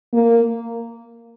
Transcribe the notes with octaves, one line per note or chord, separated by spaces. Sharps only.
A#3